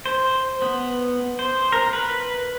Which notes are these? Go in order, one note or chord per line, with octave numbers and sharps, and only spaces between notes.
C5
B3
C5
A#4
B4